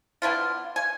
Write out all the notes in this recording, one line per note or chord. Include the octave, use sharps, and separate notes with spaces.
B3 D4 E4 F4
G#5